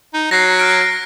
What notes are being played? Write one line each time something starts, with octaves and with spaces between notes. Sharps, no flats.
D#4
F#3 A#6 C7
F6 D7